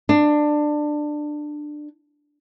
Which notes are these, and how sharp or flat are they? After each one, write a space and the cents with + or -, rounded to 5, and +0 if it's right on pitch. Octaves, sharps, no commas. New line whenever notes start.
D4 +20